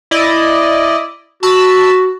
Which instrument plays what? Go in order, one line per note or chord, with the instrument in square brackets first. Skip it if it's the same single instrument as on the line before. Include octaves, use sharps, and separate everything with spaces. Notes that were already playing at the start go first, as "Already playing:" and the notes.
[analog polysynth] E4 D5 D#5
[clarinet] F#4 [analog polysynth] A5 B5 E6